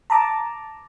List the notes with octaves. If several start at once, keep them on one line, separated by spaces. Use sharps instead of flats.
A5 A#5 D6